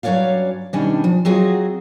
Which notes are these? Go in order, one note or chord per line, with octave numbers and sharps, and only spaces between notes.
G2 F#3 C#4 C#5 D5 F5
B2 D#3 G3 C#4 D4 G#5
F3
F#3 C4 F4 F#4 G#4 D#5